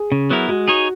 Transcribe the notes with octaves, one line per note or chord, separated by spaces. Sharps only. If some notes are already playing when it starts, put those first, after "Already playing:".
Already playing: G#4
C#3
F#3 B3 E4 A#4
G#3 F#4
D#4 G#4 C#5